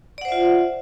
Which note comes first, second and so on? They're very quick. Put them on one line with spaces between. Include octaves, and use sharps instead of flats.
D5 F#5 C5 E5 F4